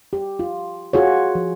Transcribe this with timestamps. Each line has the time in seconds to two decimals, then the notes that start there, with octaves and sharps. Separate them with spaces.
0.13 G4
0.39 F4
0.93 F4 F#4 G#4 C#5
1.35 F3